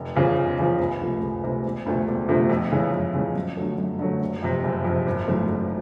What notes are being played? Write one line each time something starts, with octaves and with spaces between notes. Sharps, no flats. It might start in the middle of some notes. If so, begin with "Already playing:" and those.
Already playing: F1
E2 C#3 F3
F1
E2 C#3 F3
C#2
C3 F3 A3
C#2
C3 F3 A3
E1
D2 C3 F3 A3
E1
D2 C3 F3 A3
F2
C#3 E3 G#3 C#4
F2
C#3 E3 G#3 C#4
F#2
D3 F#3 A3
F#2
D3 F#3 A3
F#1
F2 C3
F#1
F2 C3
G#1
F#2 C#3 E3 A3
G#1